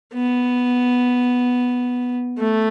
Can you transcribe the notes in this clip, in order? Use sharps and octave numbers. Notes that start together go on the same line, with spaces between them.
B3
A3